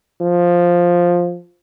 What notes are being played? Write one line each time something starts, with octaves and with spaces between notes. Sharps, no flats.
F3